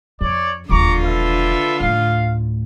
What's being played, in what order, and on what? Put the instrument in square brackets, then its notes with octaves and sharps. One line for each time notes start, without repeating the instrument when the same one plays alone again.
[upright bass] F2 [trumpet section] C#5 D5
[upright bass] E1 D#2 [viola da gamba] D3 F4 [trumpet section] A#5 C#6 D6
[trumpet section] A4 B4 E5
[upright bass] D2 A2 [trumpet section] F5